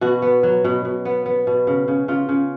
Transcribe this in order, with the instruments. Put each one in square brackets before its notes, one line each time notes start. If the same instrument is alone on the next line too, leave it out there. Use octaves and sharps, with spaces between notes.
[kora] B2 F#4
B3
F#3
B2
B2
B3
B3
B2
C#3
C#3
C#3 F4
C#3